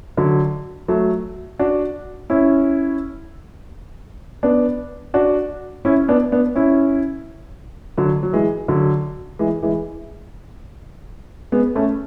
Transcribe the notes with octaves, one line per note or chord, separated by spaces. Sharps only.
D3 F#3
F#3 A3
D4 F#4
C#4 E4
B3 D4
D4 F#4
C#4 E4
B3 D4
B3 D4
C#4 E4
D3 F#3
F#3
E3 G#3
D3 F#3
E3 G#3
E3 G#3
G#3 B3
A3 C#4